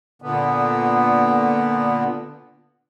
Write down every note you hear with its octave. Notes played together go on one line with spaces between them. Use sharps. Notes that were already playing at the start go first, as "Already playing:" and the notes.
A#2 D3 B3